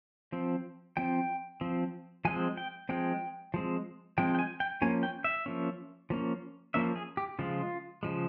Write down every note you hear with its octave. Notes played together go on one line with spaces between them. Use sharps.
F3 C4
F3 C4 G5
F3 C4
F3 G#3 C4 G#5
G5
F3 G#3 C4 G5
F3 G#3 C4
F3 G#3 C4 G5
G5
G#5
G5
F3 A#3 C#4 G#5
G5
E5
F3 A#3 C#4
F3 A#3 C#4
F3 A#3 C#4 E5
G#4
G4
C#3 F3 G#3 F4
C#3 F3 G#3